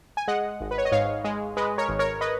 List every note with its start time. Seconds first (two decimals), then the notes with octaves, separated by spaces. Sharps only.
0.17 G#5
0.28 G#3 D#5 F#5
0.61 G#1
0.71 B4
0.78 C#5
0.85 D#5
0.92 G#2 C#5 F5
1.24 G#3
1.57 G#3 B4 D#5
1.78 A#4 C#5
1.89 G#1
1.99 A#4 C#5
2.21 B4 D#5